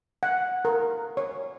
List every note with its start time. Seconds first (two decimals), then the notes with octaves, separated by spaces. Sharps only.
0.23 F#5
0.65 A#4
1.17 C#5